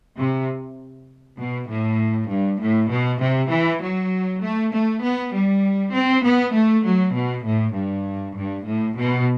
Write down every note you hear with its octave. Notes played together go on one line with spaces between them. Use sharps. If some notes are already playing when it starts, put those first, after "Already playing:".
C3
B2
A2
G2
A2
B2
C3
E3
F#3
A3
A3
B3
G3
C4
B3
A3
F#3
B2
A2
G2
G2
A2
B2